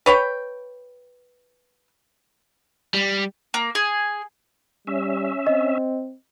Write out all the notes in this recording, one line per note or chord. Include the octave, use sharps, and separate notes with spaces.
B4 C#5 G5
G3
A#3
G#4
G3 C#4 E5
C4 D#5